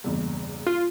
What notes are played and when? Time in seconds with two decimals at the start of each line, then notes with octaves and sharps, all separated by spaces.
0.04 F#1 E2 G2
0.67 F4